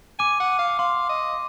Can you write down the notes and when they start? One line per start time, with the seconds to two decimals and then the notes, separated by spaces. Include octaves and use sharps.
0.19 G#5 D6
0.40 F#5
0.59 F5
0.78 F5 C6
1.09 D#5